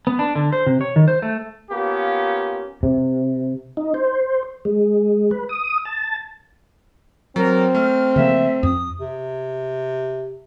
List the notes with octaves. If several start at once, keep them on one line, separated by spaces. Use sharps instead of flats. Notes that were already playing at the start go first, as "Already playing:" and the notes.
B3
D4
D3
C5
C3
C#5
D#3
C5
A3
A#3 B3 C#4 F4 G4
C3
D#4
C5
G#3
B4
D#6
A5
F#3 C4 A#4
A3 F6
C#3 F3 A#3 E5
F2 D#6
C3